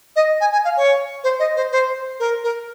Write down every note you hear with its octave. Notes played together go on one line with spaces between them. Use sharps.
D#5
G#5
G#5
F5
C#5
C5
D#5
C5
C5
A#4
A#4